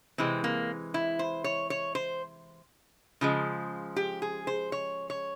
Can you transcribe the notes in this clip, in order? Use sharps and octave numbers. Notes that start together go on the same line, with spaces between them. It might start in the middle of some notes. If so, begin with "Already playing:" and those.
C3 E3 G#3 C4
A#3
E4
C5
C#5
C#5
C5
C#3 F3 G#3
G4
G#4
C5
C#5
C#5